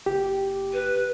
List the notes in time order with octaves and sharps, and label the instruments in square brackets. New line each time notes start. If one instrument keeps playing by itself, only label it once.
[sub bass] F#1 [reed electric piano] G4
[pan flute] B4